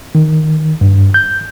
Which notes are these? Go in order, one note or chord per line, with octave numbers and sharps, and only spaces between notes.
D#3
G2
G6